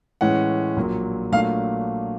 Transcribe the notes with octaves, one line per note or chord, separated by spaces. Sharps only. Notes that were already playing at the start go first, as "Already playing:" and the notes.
A2 E3 G#3 C#4 F#5
A#1 A#2 F#3
A#2 F#3 A3 D4 F5